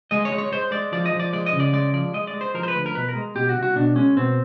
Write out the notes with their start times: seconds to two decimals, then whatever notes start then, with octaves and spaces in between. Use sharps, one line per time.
0.11 G#3 D#5
0.25 C#5
0.32 G#3
0.38 C#5
0.52 G#3 C5
0.72 G#3 D5
0.92 F3 D5
1.06 D#5
1.13 F3
1.20 D5
1.33 G#3 D5
1.46 D#5
1.53 C#3
1.60 D5
1.73 G#3 D5
1.93 F3 D5
2.14 G#3 D#5
2.27 D5
2.34 G#3
2.41 C5
2.54 F3 A#4
2.63 C5
2.68 B4
2.75 D2
2.86 A#4
2.95 B2 B4
3.09 A#4
3.15 G#3
3.35 B2 G4
3.49 F#4
3.56 C2
3.63 F#4
3.76 B2 D4
3.96 G#3 C#4
4.17 B2 C4